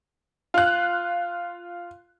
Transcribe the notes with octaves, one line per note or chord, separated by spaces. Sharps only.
F4 F#6